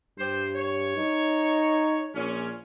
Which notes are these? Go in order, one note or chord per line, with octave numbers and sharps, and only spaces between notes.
G2 G4 C5
C#5
D#4
A#1 A#2 C#4